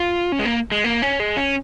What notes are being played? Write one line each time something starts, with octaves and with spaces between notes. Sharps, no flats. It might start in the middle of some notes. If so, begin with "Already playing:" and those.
Already playing: F4
C#4
G#3
A#3
G#3
A#3
C#4
G#3
C#4